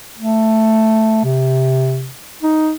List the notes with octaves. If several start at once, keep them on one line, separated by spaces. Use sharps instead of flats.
A3
C3
D#4